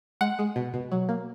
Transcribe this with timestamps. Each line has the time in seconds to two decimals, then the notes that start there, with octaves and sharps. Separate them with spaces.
0.21 G#3 F#5
0.39 G#3
0.56 B2
0.74 B2
0.92 F#3
1.09 A#3